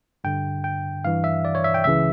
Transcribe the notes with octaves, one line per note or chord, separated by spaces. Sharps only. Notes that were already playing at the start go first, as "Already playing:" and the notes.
G2 D3 G5
G5
G2 E3 F5
E5
D5
C#5
E5
G5
C#2 C#3 E3 E5